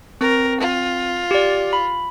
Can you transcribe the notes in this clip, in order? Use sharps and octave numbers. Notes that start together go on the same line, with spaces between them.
C4 A#4
F4
G4 D5
B5